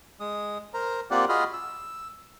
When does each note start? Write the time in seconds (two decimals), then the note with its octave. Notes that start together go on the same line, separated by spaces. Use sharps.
0.20 G#3 D#6
0.74 A#4 C5 A#5
1.11 A#3 C4 F4 G4 D5 F#5
1.29 F4 F#4 G#4 D#5 B5 F6
1.53 E6